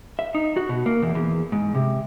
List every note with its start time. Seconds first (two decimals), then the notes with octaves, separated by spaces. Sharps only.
0.19 E5
0.35 D#4
0.57 F#4
0.69 B2
0.86 A#3
1.02 E2
1.15 E2
1.52 G#2
1.75 C3